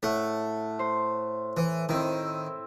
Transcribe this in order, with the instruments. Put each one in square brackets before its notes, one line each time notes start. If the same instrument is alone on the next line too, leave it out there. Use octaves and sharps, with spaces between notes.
[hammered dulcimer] A2 F#5 [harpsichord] A3
[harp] C5
[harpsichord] E3
[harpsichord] D#3 [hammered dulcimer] C4 E4